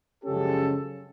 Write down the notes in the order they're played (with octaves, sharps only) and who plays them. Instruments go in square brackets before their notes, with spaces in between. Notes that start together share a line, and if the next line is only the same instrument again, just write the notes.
[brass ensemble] F#2 C#3 F3 G#3 C#4 G4 A4